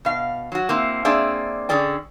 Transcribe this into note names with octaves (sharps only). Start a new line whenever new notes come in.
B2 F5
F#3 F#4
A#3 C4 E4
A#3 C4 D4 G#4 D5 E5
D3 C#4 G#4 D5 G5